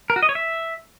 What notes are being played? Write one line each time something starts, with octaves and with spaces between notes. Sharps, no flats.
A#4
F#4
D#5
C#5
E5